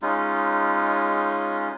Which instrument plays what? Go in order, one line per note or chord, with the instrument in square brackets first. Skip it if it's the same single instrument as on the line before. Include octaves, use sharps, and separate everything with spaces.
[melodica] G#3 C#4 D#4 F4